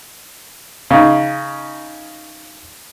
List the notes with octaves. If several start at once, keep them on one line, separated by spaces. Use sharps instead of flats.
C#3 D#4